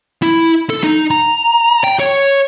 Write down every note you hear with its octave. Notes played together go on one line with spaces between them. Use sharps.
E4
A4
D#4
A#5
G5
C#5